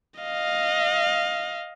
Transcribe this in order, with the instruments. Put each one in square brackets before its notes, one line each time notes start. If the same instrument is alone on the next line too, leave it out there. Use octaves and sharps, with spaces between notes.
[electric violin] D#5 F5